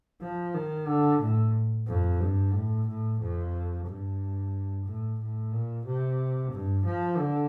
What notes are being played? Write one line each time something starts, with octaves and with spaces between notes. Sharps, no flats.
F3
D#3
D3
A2
F2
G2
A2
A2
F2
G2
A2
A2
A#2
C3
G2
F3
D3